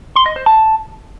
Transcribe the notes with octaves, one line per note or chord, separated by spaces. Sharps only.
C6
D#5
C5
A5